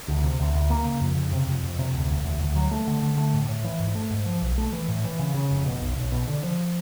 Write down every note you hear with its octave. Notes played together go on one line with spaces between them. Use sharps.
D2
C3
D2
D2
A#3
C#3
F2
C#3
C3
F2
F2
C3
D2
E1
D2
D2
F#3
A3
D3
D3
A3
A2
A2
E3
G#2
A3
G#2
F3
B1
A3
E3
A2
E3
C#3
C#3
F1
B2
B1
B1
B2
D3
F3